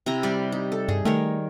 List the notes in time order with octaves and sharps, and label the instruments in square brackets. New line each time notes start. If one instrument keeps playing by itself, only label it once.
[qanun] C3 E4 A#5
[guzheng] G3 D5
[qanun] D#4
A4
[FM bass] G2 [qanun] G#4
[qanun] D#3 A#4 C#5 [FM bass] A3